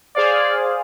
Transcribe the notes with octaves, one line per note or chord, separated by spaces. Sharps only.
G#4 C5 D5 F5